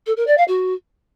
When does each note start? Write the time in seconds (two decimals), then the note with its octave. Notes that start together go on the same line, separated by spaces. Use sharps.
0.06 A4
0.17 A#4
0.27 D5
0.37 F5
0.48 F#4